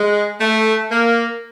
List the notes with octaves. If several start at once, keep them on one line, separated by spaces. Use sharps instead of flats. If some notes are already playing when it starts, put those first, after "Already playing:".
Already playing: G#3
A3
A#3